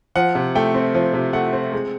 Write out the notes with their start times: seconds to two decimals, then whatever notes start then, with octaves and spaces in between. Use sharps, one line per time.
0.16 F3 F#5
0.35 C3
0.55 A3 G5
0.74 C4
0.94 F3
1.14 C3
1.33 A3 F#5
1.53 C4
1.72 G#3